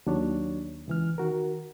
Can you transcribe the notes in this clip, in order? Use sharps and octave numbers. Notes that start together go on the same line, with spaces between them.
D#2 F#3 D4 C#5
C#2 E3 F6
D#3 F#4 A#4